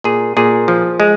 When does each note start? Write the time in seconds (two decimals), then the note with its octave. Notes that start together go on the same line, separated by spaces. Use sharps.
0.04 A#2 G#4
0.37 A#2 G#4
0.68 F3
1.00 G#3